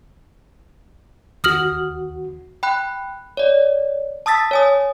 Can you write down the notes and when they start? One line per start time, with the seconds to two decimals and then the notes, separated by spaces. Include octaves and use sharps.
1.44 D#2 F#4 D#6 F6 F#7
2.63 G5 B5 F#6
3.37 C#5 D5
4.26 A5 D#6 E6 A6 B6
4.51 C#5 G#5 D#6